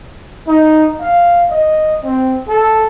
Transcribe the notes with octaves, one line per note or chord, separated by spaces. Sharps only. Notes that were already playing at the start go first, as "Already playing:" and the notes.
D#4
F5
D#5
C4
A4